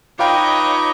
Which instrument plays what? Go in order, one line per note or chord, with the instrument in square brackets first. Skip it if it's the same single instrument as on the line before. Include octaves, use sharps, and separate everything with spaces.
[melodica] D#4 B4 D6 [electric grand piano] F4 F5 G5 [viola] C#5 D#5